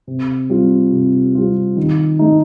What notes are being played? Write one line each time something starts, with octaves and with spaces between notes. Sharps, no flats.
C3
G3 C4 F4
C3
G3 C4 F4
D#3
A3 D#4